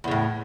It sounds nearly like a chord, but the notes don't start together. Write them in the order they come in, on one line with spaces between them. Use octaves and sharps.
E2 C#3 A2